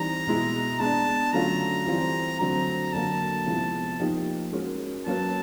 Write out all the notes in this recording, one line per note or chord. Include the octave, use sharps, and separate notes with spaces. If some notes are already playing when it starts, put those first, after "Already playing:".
Already playing: E3 G3 C4 D#4 A#5
B2 G#3 B3 E4
G#3 B3 D4 A5
D3 F#3 A3 C#4 F4 A#5
E3 G3 C4 F4
D3 F#3 A3 C4 A#5
D3 F#3 A#3 A5
C3 F3 G#3 B3 E4
F3 A#3 D#4 G4
G#3 C#4 F#4 A#4
F#3 A#3 C#4 F#4 B4 A5